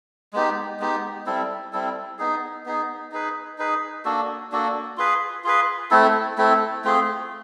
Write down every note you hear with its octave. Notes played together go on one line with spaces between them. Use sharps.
G#3 B3 D#4 G4
G#3 B3 D#4 G4
G3 C4 E4 A4
G3 C4 E4 A4
B3 D#4 G#4
B3 D#4 G#4
D#4 G#4 B4
D#4 G#4 B4
A#3 D4 F#4 A4
A#3 D4 F#4 A4
F4 G#4 B4
F4 G#4 B4
A3 C4 E4 A4
A3 C4 E4 A4
A3 C4 F4 G#4